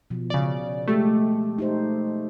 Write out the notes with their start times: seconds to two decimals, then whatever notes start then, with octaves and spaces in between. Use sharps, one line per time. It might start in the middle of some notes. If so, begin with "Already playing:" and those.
0.10 B2 F3
0.30 C#3 D5
0.87 G#3 A3 G4 A4
1.58 D#4 G4 C5